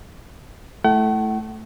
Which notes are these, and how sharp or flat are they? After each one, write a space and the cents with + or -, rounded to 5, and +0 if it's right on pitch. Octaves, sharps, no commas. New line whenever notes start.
A3 -10 E4 +0 F#5 +45